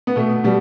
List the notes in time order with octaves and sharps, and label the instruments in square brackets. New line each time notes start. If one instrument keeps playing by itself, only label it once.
[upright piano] B3
B2 A3
B2 G3